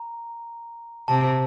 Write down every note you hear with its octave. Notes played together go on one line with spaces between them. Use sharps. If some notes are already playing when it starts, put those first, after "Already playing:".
Already playing: A#5
C3 A5